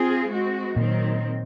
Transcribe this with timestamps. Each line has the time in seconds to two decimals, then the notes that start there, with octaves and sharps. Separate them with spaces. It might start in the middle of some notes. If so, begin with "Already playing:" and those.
Already playing: C4 F4 G#4
0.30 G#3 C4 F#4
0.76 A#2 D#3 F#3 C4